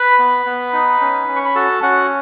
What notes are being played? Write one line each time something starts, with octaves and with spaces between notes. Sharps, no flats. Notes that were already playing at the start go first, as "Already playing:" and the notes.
Already playing: B4 B5
B3
B3
D#4
C#4
C#4
C#6
B5
F#4 A4 A5
C#4 F#4 F#5